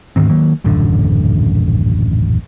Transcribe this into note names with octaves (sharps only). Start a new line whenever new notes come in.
D2 G#2 D#3 C4
D#3 F#3 A#3
D#1 A1 F#2 D3